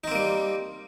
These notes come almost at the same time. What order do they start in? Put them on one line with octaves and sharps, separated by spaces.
D#4 C4 A#3 G3